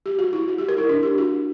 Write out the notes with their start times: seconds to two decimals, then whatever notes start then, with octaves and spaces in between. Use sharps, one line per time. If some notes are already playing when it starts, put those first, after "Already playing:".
0.06 G4
0.19 F#4
0.33 E4
0.48 F#4
0.58 G4
0.69 A#4
0.78 E4
0.89 D4
1.03 G4
1.18 F#4